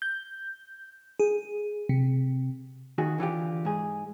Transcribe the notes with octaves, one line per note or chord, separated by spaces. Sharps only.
G6
G#4
C3
D#2 D#3 F#4 G#4
D3 E3 F4 G4
G#2 G#4